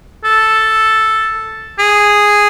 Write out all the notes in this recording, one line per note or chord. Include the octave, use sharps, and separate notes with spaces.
A4
G#4